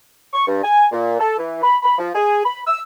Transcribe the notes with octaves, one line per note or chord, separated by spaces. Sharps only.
C#6
G2
G#5
A#2
A4
E3
B5
B5
F3
G#4
B5
E6